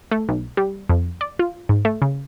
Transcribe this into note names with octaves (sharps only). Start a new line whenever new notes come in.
A3
B1
G3
F2
D5
F4
G#2
A3
C#3